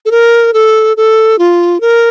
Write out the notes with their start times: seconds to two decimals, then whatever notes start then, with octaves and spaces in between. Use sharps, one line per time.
0.05 A4
0.11 A#4
0.53 A4
0.97 A4
1.39 F4
1.81 A#4